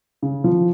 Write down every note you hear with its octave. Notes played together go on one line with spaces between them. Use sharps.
C#3
F3